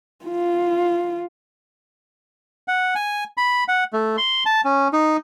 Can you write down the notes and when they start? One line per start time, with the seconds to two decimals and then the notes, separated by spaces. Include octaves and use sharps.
0.24 F4
2.68 F#5
2.95 G#5
3.37 B5
3.68 F#5
3.93 A3
4.18 C6
4.46 A5
4.65 C#4
4.93 D#4